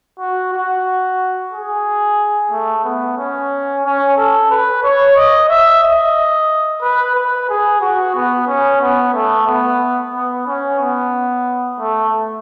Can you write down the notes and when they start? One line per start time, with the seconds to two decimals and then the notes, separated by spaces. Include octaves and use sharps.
0.19 F#4
0.53 F#4
1.52 G#4
2.51 A3
2.84 B3
3.17 C#4
3.85 C#4
4.16 A4
4.51 B4
4.83 C#5
5.17 D#5
5.49 E5
5.83 D#5
6.82 B4
7.15 B4
7.49 G#4
7.81 F#4
8.15 B3
8.48 C#4
8.82 B3
9.14 A3
9.47 B3
10.14 B3
10.47 C#4
10.80 B3
11.79 A3